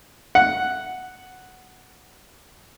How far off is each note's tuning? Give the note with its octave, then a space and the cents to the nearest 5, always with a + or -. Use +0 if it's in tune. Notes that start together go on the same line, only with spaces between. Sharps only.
F#5 +0